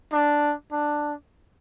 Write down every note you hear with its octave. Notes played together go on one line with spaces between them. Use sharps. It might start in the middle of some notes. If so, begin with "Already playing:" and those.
D4
D4